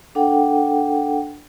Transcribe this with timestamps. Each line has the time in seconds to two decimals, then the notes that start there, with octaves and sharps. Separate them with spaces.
0.15 D4 A4 F#5 G5